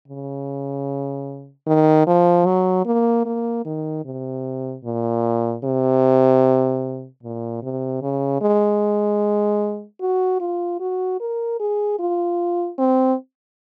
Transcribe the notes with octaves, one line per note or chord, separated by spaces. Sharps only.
C#3
D#3
F3
F#3
A#3
A#3
D#3
C3
A#2
C3
A#2
C3
C#3
G#3
F#4
F4
F#4
A#4
G#4
F4
C4